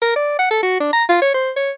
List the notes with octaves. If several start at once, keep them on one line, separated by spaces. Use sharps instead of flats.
A#4
D5
F#5
A4
F#4
D4
A#5
F4
C#5
C5
C#5